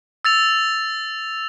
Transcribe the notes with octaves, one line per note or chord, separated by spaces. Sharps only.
E6 A6 F7